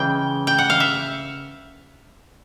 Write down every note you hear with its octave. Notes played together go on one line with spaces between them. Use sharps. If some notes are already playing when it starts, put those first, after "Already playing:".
Already playing: C#3 E3 G#3 G5
G5
F#5
F5
E5